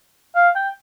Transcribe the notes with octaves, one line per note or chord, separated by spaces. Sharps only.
F5
G5